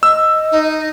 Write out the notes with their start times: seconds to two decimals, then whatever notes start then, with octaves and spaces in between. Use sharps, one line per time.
0.03 D#5 E6
0.52 D#4